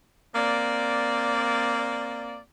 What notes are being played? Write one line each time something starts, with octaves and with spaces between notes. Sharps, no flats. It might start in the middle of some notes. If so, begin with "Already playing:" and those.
A#3 C4 D5